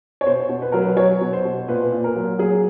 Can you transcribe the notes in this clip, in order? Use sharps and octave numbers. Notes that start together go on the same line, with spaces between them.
C#5
B2 C5
B2
B4
F#3 A#4
B4
F#3 C#5
B2
C5
B2
A#2 B4
A#2
A#4
F#3
F#3 G#4